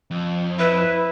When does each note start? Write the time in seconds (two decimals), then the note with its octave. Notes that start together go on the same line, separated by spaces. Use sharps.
0.11 F2
0.59 E4 B4